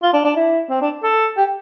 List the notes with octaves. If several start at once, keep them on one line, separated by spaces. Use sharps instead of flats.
F4
D4
D4
E4
C4
D4
A4
G4